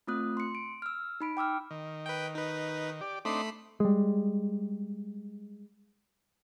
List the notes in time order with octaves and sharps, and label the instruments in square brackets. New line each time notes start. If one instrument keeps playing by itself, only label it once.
[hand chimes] A3 C4 F4 D#6 F#6
C6 C#7
D7
E6 F6
D#4 B5 D7
G5 D6 E6 F6
[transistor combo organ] D#3
[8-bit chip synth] B4 G5
D#4 B4
[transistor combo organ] G4 D5
[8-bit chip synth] A3 B5 C7 [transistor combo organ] C4 D4 D#4
[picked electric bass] G3 G#3